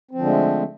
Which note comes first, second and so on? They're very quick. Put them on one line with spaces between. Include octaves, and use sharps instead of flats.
C4 F3 D3 G#3 A3